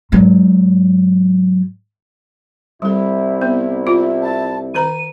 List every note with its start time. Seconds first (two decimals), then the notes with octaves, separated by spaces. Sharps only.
0.12 G#2 F#3
2.82 C2 G3 E4 A4
3.42 B3
3.87 F4
4.22 A5
4.74 D#3 A#4 A#5 D#7